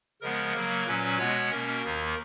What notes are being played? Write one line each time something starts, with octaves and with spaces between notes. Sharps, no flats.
C#3 F3 G#3 B3 A#4
C#3 F#3 A#3
A#2 F#3 C#4 B4
B2 G#3 B3 C#5
B2 A#3 C#4 A#4
D#2 D#3 A#3